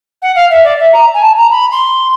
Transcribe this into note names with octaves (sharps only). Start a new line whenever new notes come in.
F#5
F5
E5
D5
E5
A#5
G#5
A5
A#5
B5
C6